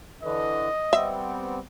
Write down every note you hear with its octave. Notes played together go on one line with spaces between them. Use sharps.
D3 E3 D#5
G3 B3 C4 E5